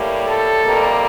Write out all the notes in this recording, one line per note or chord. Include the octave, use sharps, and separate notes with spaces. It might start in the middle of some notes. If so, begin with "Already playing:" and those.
Already playing: A2 G3 A#3
A4
F2 C3 G3 A#3